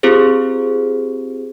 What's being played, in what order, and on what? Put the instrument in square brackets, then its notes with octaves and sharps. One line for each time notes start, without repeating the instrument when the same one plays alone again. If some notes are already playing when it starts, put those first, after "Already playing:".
[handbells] C4 F4 G4 G#4 C5